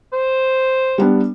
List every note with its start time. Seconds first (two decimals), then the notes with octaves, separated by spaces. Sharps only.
0.13 C5
0.98 G3 B3 D4